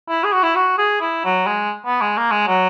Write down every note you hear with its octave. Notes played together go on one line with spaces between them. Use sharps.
E4
G#4
F#4
E4
F#4
G#4
E4
F#3
G#3
B3
G#3
A#3
G#3
F#3